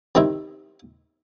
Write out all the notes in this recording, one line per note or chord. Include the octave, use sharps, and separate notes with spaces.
C3 D#3 C4 D#4 E4